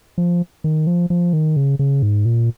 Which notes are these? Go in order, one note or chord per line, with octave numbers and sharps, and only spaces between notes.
F3
D#3
F3
F3
D#3
C#3
C#3
G#2
A#2